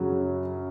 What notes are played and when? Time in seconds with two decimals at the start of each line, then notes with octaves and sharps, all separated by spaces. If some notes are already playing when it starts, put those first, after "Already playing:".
Already playing: F#2 C#3 F#3